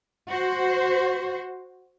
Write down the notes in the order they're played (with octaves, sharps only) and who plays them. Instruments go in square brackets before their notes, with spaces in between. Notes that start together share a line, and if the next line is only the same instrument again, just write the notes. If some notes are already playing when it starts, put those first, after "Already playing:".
[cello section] F#4 C5